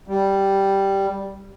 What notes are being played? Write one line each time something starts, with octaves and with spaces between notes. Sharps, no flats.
G3